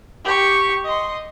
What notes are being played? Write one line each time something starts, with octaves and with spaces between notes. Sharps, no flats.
G4 C#6
D#5 C6